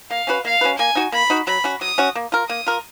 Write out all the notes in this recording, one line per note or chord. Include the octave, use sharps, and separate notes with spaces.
A#3 F5
C#4 F#4 B4
A#3 F5
C#4 F#4 B4
A#3 G#5
D#4 F#4
A#3 B5
D#4 F#4
F#3 B5
C#4 F#4
F#3 D#6
C#4 F#4
A#3
F4 A#4
A#3 D#6
F4 A#4